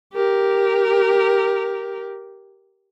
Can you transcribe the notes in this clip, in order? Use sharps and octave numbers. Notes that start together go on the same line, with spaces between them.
G4 A#4